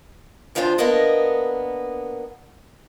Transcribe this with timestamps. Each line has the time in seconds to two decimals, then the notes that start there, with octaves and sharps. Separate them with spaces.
0.55 D2 F3 D4 F4 C5
0.78 A#3 B3 D4 A#4 D#5